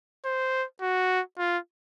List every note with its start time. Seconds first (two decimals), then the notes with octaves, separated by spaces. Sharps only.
0.25 C5
0.81 F#4
1.38 F4